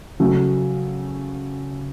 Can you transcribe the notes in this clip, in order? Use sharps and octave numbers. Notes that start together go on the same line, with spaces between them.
C#3 F#3 A3